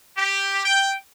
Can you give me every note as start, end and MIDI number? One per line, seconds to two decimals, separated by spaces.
0.17 0.64 67
0.64 0.93 79